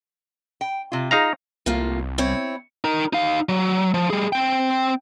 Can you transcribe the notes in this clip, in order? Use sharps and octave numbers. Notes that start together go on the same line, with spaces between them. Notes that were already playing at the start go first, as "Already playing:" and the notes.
G5
C3 F4
D#4 F4 G#4 F5 A#5
C2 A2 A#3 F4
C4 E4 C#5
D#4 A#4
D#4 F5
F#3
F3
G3 G#4
C4 G5